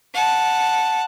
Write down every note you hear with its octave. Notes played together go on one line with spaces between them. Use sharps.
F#5 A5